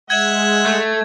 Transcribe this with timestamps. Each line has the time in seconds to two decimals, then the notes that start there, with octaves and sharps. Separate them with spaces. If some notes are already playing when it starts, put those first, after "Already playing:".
0.10 G#3 E5 F#5 G#6
0.66 A3